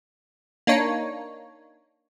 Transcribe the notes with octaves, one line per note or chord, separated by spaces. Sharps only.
A#3 D4 D#4 C#5